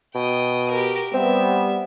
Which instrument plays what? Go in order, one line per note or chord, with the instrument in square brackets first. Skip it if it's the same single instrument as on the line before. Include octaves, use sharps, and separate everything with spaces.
[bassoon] B2 [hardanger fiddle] G5 D#6
[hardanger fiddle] G4 A#4
[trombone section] G3 B3 [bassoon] C4 [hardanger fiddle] E5